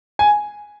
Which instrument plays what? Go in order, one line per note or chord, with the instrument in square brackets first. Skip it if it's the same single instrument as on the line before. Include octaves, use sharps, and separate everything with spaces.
[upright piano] G#5